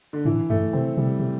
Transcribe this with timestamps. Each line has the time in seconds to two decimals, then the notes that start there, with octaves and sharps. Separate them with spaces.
0.13 D3
0.25 A2 E3
0.50 G2 A3
0.73 C3 C4
0.97 C3 G3
1.19 C3